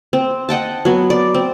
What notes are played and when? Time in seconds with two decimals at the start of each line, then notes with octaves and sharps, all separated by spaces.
0.13 C4
0.49 D#5 F#5 G5 A5
0.85 F#3 B3
1.10 D5
1.34 C4